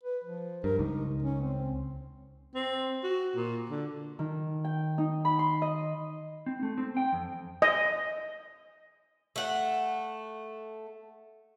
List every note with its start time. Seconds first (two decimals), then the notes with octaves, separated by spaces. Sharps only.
0.03 B4
0.24 F3
0.64 G2 A#4
0.79 C#2 D#4
1.23 C#4
1.42 C4
2.55 C4
3.04 F#4
3.36 A#2
3.69 D3
4.19 D#3
4.64 G5
4.98 D#4
5.25 B5
5.39 C6
5.62 D#5
6.46 C4
6.63 A3
6.78 C4
6.97 G5
7.13 F2
7.62 D#5
9.36 A3 F#5